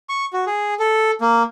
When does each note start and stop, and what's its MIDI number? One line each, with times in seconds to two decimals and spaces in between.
0.09 0.25 85
0.33 0.45 66
0.47 0.74 68
0.80 1.11 69
1.21 1.43 58